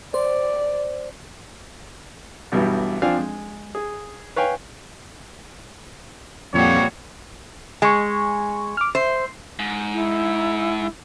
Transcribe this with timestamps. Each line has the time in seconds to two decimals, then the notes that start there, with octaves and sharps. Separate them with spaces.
0.14 C5 D5
2.52 B1 G2 B2 E3 G3
3.02 F2 F3 C4 D4 F5 G#5
3.18 G#3
3.75 G#4
4.36 B4 C#5 F5 G5 G#5
6.54 F2 A#2 G3 F#4 C#5
7.82 G#3 G#5 C#6
8.77 D6 F6
8.95 C5 E5
9.59 G#2
9.94 E4